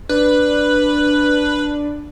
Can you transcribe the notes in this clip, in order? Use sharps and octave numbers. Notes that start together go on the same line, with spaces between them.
D4 B4